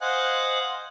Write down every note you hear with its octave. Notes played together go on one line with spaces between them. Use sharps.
C5 D#5 F5 F#5 G#5 F#6